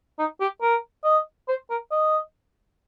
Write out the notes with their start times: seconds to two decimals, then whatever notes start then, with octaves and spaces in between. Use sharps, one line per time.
0.19 D#4
0.40 G4
0.62 A#4
1.04 D#5
1.48 C5
1.70 A#4
1.91 D#5